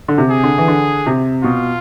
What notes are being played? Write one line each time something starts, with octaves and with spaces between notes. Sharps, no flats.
D3
C3
G#4
D3
E3
D3
C3
B2 F4